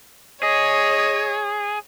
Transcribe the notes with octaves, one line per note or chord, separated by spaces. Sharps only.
G#4 C#5 D#5